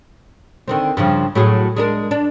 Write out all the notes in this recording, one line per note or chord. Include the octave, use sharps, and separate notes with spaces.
D3 D#3 C4
G2 C#3 F3
A2 F#3 G#4
G#3 D4 A#4
D4